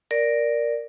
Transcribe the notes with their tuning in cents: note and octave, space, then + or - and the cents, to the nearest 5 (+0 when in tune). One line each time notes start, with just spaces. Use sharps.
A#4 +0 D5 +0